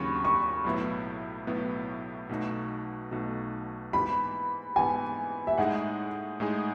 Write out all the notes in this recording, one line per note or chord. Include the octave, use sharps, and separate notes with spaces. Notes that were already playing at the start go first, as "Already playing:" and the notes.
Already playing: D#2 C#3 F#3 B5 C#6
C#6
B1 A2 F#3 B3 E4
B1 A2 F#3 B3 E4
B1 B2 A3 D#4 F#4
B1 B2 A3 D#4 F#4
G#2 E3 B3 B5
G#2 E3 B3 G#5
E5
A2 G#3 D#4 G#4 F#5
A2 G#3 D#4 G#4